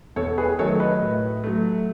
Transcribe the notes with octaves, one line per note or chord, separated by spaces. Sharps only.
E2 A4 C#5
G#4 B4
D#3 F#3 A3 A4 C#5
B4 D#5
A2
F#3 A3